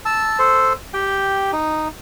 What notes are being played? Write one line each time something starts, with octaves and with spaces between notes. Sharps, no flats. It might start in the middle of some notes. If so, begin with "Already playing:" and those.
A5 E6
A4 C5
G4 G5
D#4